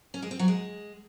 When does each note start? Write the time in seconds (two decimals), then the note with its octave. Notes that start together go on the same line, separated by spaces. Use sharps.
0.14 C#4
0.22 G#3
0.31 C4
0.39 F#3
0.48 G#3